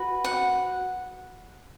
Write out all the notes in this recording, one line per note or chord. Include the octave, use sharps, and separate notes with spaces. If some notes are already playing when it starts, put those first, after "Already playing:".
Already playing: F#4 B4
F#5